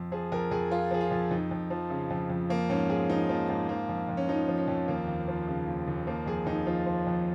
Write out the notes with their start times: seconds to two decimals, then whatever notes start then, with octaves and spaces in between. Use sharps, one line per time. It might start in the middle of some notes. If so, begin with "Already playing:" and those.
Already playing: F2
0.12 F3 G#4
0.32 F2 A#4
0.51 F2 G#4
0.71 F3 F4
0.91 F3 G#4
1.01 F4
1.11 F2
1.31 F2 D#4
1.51 F2
1.70 F3
1.90 C#3
2.10 F2
2.30 F2
2.50 F3 A#3
2.70 G#2 C#4
2.89 G#2 G#4
3.10 F3 D#4
3.29 F3 A#3
3.48 G#2 A#3
3.69 F3 A#3
3.89 F2
4.09 F2
4.17 C#4
4.28 F3 D#4
4.48 F3
4.58 C#4
4.68 F2
4.88 D#2 A#3
5.07 D#2
5.28 F3
5.47 C#3
5.67 D#2
5.88 D#2
6.07 F3 A#3
6.26 F2 G#4
6.46 F2 D#4
6.66 F3 F4
6.86 F3
7.07 F2